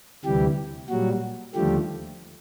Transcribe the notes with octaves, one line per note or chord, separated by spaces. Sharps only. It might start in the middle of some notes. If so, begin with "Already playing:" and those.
D2 C3 E3 G3 G4
A#2 F#3 G3 F#4
D#2 D3 F3 G3 A3 G4